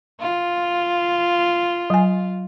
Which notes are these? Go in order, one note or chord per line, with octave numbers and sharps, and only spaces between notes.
F4
F#3 G#5